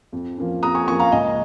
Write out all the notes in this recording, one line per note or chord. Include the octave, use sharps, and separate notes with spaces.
F2
F3 A#3 C#4
F2 A#5 D#6
G#5 C#6
F3 A#3 C#4 G#5 C#6
F5 A#5
C#2 D#5 G#5